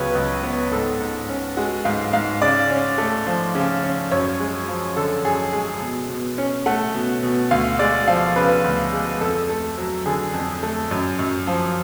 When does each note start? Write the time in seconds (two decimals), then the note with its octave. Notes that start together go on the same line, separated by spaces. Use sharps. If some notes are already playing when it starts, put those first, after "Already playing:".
Already playing: C#2 C#3 F#3 B3 B4 C#5
0.15 C#2
0.43 B3
0.72 G#2 A4
1.00 G#2
1.29 C#4
1.57 G#3 F#4
1.85 G#2 F5
2.13 G#2 F5
2.41 C#3 D5
2.70 C#4
2.98 A3
3.26 F3
3.55 C#3
3.83 C#4
4.11 F#2 C#5
4.40 G#3
4.68 F3
4.97 D3 A4
5.25 F#2 G#4
5.53 G#3 G#4
5.81 B2
6.09 B2
6.38 C#4
6.66 A3 F#5
6.94 B2
7.23 B2
7.51 D2 F5
7.79 G#3 D5
8.07 F3 F5
8.36 C#3 B4
8.64 D2
8.93 G#3
9.21 F2 A4
9.49 A3
9.78 F#3
10.06 D3 G#4
10.34 F2
10.63 A3
10.91 F#2
11.19 F#2
11.47 F3